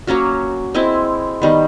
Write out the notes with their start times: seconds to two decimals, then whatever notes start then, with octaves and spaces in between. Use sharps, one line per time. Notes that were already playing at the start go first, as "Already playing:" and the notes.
0.07 F#3 A#3 C#4 F#4
0.74 G#3 C4 E4
1.42 D#3 G3 B3